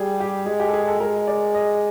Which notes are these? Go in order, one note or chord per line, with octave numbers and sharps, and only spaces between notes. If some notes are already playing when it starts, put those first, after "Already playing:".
Already playing: G3 G#4
G4
G#3 G#4
G4
A4
G#4
A4
G#3 A#4
D5
D#5